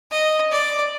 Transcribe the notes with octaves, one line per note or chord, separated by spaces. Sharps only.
D#5
D5